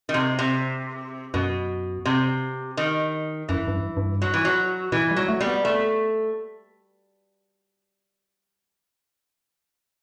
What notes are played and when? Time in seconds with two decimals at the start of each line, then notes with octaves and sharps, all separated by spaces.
0.09 D#3
0.14 C3
0.39 C3
1.34 F#2 B2
2.06 C3
2.77 D#3
3.49 F#2 E3
3.68 G2
3.73 F#2
3.97 G2
4.22 F#3
4.34 E3
4.45 F#3
4.92 B2 E3
5.11 G3
5.16 F#3
5.28 A3
5.41 G3
5.47 B3
5.65 A3